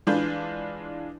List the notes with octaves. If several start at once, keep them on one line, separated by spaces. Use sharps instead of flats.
E3 G#3 D4 F4 B4 G6